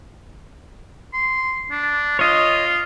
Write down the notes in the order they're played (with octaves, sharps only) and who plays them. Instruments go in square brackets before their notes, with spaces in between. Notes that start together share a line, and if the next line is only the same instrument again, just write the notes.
[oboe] C6
D4
[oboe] F4 [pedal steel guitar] C#5 D#5